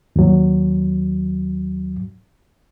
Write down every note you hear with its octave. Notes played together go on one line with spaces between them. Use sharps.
D#2 F#3